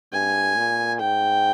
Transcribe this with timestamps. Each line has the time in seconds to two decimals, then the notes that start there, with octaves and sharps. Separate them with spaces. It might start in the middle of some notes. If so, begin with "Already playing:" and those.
0.13 G2 G#5
0.56 A#2
1.00 G#2 G5